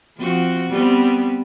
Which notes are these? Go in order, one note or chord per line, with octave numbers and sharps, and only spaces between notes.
F3 C4 F#4
G3 B3 C4